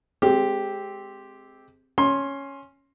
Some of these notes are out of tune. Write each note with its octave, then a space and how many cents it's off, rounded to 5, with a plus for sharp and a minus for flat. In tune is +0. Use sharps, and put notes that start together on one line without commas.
G#3 +25 C4 +0 G4 +0
C#4 +0 C6 +20